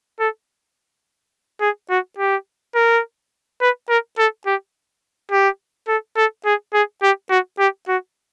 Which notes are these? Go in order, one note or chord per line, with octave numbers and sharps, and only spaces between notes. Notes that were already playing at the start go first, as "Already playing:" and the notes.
A4
G#4
F#4
G4
A#4
B4
A#4
A4
G4
G4
A4
A4
G#4
G#4
G4
F#4
G4
F#4